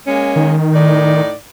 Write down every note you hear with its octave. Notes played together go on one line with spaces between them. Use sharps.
G#3 A#3 C#4
D#3
A2 D#4 D5